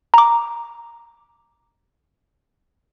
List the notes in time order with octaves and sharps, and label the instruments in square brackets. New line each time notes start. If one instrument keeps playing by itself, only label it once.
[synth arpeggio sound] A#5 D6